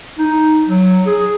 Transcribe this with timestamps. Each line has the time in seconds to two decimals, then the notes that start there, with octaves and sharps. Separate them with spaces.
0.19 D#4
0.67 F#3
1.06 G#4